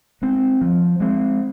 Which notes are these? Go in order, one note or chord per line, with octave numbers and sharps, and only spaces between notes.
G#3 C4
F3
G#3 C4